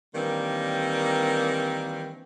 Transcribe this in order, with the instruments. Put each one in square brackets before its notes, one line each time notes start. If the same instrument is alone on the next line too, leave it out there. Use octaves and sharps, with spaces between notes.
[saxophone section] D#3 E3 G3 A#3 C4 D4